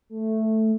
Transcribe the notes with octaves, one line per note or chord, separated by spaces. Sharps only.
A3